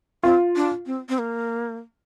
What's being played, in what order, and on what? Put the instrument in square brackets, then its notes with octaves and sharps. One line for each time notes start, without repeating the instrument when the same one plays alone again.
[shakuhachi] C4 [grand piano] F4
[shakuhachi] D4
C4
C4
A#3